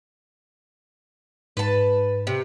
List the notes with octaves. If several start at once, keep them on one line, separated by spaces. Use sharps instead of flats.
G#2 B4 A5
C3